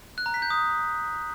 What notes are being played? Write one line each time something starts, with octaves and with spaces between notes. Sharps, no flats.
F#6
A#5
B6
G6
D#6